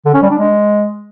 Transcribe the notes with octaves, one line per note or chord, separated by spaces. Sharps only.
D3
C#4
G3
D4
G#3